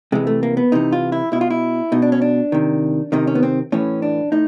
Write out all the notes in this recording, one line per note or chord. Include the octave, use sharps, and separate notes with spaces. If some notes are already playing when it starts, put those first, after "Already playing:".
C3 E3 G#3
A3
A#3
B3
C3 E3 D#4
F4
E4
B2 E4
F4
E4
B2 D#4
D4
C#4
D4
C3 D#3
C3 D#3 D#4
C#4
B3
C4
A2 E3 C#4
D4
A2 D#4